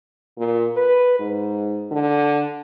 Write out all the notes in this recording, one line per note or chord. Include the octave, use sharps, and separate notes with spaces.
A#2
B4
G#2
D3